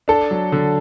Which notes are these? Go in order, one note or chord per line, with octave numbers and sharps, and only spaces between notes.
D4 A4
F#3
D3